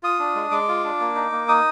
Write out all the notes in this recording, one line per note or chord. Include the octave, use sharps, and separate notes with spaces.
F4 D#6
D4
G#3
G#3 D6
F4
D4
A#3
D#4
A#3
D#4 D#6